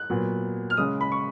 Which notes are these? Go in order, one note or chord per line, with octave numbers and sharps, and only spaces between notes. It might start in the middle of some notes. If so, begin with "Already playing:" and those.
Already playing: F#6
A#2 F#3 B3
F6
C#3 G#3 C#4 D#6
B5
C#6